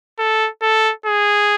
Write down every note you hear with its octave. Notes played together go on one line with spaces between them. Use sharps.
A4
A4
G#4